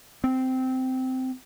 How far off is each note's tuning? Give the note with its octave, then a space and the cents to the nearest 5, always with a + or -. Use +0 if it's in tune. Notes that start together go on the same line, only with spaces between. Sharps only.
C4 -15